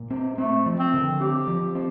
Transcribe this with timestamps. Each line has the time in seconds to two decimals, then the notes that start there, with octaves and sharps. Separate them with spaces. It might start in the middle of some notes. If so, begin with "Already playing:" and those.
Already playing: A#2
0.10 C4
0.38 A3 C4
0.66 F3
0.79 C4
0.94 D3
1.20 C4 G4
1.47 F3
1.75 C4